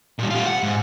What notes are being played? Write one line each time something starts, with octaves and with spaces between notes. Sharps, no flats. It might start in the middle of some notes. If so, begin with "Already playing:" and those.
A#2 G3
F4 G4
F#5
G#2